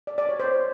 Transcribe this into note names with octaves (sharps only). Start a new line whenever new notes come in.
D5
D5
C#5
C5